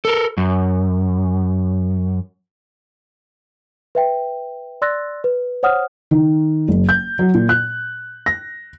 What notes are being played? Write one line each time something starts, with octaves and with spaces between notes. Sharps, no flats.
A4 A#4
F#2
B4 E5 G5
D5 C6 E6 F#6 A6 A#6
B4
C5 C#5 F#5 D#6 F6
D#3
F#1
G6
F#3
A#2
F#6
A#6